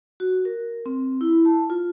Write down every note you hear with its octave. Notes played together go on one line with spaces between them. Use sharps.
F#4
A#4
C4
E4
A5
F4